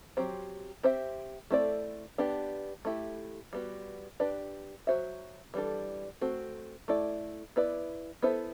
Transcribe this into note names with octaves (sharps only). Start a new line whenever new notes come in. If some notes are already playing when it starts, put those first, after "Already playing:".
F#3 C4 G4 C5
C4 G4 C5 E5
A3 C4 E4 A4 D5
B3 D4 G4
A3 E4 G4
G3 B3 F#4
D4 G4 B4 D5
F#3 B3 F#4 C5 E5
E3 G3 D4 A4
A3 C4 F#4
A3 E4 A4 D5
B3 E4 B4 D5
B3 E4 A4 C5 E5